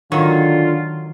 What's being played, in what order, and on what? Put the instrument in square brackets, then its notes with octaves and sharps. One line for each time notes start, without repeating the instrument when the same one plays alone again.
[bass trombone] D3 [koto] D#3 [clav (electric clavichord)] F#3 [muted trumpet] F4